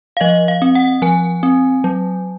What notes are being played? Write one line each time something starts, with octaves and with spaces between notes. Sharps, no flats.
F5
F3 D#5
F5
C4
F#5
F3 G#5
C4
F#3